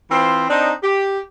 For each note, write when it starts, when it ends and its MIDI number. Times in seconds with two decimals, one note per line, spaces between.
0.11 0.45 52
0.11 0.45 60
0.11 0.45 65
0.11 0.45 72
0.50 0.73 60
0.50 0.73 62
0.50 0.73 63
0.84 1.20 67